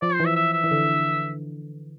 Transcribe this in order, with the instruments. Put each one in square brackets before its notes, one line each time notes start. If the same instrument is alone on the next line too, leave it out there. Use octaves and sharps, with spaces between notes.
[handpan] F3 [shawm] D5
[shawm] C5
[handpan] E3
[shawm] E5
E5
E5
[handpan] E3
D3